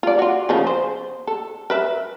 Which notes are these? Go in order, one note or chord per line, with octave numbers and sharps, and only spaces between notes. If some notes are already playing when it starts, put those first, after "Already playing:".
F4 D5
F4 F#4
C#3 F3 G#4
C5
A4
A#4 B4 E5